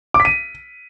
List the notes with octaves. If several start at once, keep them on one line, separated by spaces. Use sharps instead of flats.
D6
B6
D#7